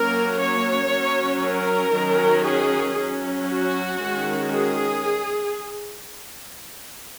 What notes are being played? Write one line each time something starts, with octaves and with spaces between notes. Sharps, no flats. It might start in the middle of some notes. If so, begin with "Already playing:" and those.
Already playing: F#3 A#3 C#4 A#4
C#5
F#3 C#4
A#4
D#3 F#3 C#4
G#4
F#3 C#4
F#4
D#3 G#3 C#4
G#4